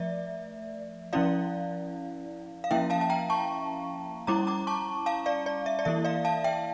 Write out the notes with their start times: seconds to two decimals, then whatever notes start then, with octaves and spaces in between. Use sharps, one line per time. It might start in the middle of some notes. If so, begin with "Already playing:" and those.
Already playing: F3 A3 D5 E5
1.13 F3 C#4 E4 D5 F5
2.64 F5
2.71 F3 A#3 C#4 E4 E5 G5
2.90 F5 A5
3.01 A5
3.10 G5 A#5
3.30 A5 C#6
4.27 G3 C#4 E4 A#5 D6
4.47 A#5 D6
4.67 A5 C#6
5.06 F5 A5
5.26 D5 F5
5.46 D5
5.66 E5
5.79 D5
5.85 E3 A#3 E4 E5
6.05 D5 F5
6.25 F5 A5
6.44 E5 G5